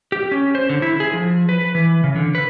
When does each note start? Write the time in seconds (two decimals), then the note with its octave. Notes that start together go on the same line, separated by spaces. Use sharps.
0.12 G4
0.31 C#4
0.55 C5
0.69 D3
0.82 E4
1.00 G#4
1.14 F3
1.49 B4
1.75 E3
2.04 C#3
2.16 D3
2.35 B4